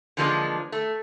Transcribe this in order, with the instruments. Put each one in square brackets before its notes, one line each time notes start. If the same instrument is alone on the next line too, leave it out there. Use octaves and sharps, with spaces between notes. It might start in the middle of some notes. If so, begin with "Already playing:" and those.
[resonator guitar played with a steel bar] D3 E3 F3 G#3 A#3 D4
A3